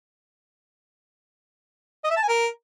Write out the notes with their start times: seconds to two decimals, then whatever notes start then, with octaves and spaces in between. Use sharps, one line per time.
2.04 D#5
2.10 E5
2.16 A5
2.23 G#5
2.29 A#4